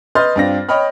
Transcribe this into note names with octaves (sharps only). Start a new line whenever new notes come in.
B4 D#5 C6 F6 G6 A6
G2 C4 D4 F4 A#6
C#5 D#5 G5 B5 F6